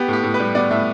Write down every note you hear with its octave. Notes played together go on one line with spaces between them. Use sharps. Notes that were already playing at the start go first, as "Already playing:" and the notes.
Already playing: B3 G4
A2
G4
A2
B4
G3
B3 D5
A2 E5